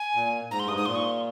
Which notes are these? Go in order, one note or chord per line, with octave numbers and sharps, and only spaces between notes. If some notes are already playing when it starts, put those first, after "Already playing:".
Already playing: G#5
A#2
G#2 A#5
C6
G2 D#6
G#2 D#6
A#2 C6
C#6
C6